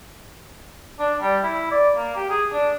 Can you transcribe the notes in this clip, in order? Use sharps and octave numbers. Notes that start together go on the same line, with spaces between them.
D4
G3
E4
D5
A#3
G4
G#4
D4